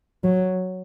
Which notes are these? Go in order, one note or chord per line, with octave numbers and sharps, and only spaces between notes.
F#3